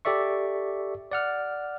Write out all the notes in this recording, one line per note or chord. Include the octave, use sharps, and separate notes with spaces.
G4 A4 D5 E5 C#6
D5 F#5 F6